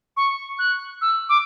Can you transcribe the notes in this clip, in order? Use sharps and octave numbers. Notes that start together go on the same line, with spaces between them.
C#6
F#6
E6
D6